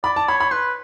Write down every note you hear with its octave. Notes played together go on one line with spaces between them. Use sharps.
D5 B5
A5
C#5 B5
B5
B4 C6